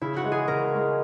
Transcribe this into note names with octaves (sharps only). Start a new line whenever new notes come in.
C#3 E4
F#4
E3 G#3
G#4
C#3 A#4
E3 G#3